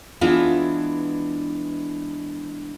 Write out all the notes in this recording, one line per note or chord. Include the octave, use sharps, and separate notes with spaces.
E3 G#3 B3 D4 E4 F4